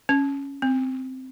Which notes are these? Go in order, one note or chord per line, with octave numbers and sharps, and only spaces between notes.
C#4
C4